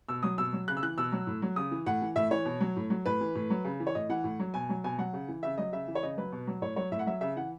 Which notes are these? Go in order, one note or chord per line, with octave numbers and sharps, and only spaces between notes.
B2 E6
F#3 D#6
B2 E6
F#3
C#3 F#6
E6
E3 F#6
B2 E6
F#3
A2
F#3
C#3 D#6
E3
A2 F#5
E3
A2 E5
E3 C#5
B2
F#3
A2
F#3
A2 B4
E3
A2
F#3
C#3
E3
C#5
A2 D#5
E3 F#5
A2
F#3
B2 G#5
F#3
B2 G#5
F#3 F#5
C#3
E3
C#3 E5
F#3 D#5
C#3 E5
E3
C#5
C#3 D#5
F#3 B4
B2
F#3
A2 C#5
F#3 C#5
A2 E5
F#5
F#3 E5
C#3 E5
E3 F#5